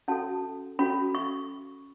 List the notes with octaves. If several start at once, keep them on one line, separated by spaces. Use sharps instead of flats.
C#4 F#4 A4 A5
C#4 F#4 A4 B5
C#6